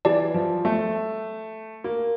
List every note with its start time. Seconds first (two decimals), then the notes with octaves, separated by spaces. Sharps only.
0.05 E3 G4 D5 A5
0.34 F3
0.65 A3
1.84 A#3